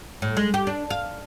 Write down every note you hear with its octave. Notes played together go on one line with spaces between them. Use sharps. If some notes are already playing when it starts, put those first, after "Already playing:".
A2
G#3
G4
D4
F5